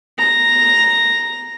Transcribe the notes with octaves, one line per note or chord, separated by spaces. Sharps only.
A#5